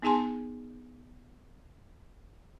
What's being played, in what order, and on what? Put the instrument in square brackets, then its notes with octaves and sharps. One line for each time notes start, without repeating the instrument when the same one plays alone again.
[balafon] B3 D#4 G#4 G#5 A5 C6